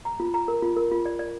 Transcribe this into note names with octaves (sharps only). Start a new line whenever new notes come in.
A#5
F4
A#5
A#4
F4
A#4
F4
D5
D5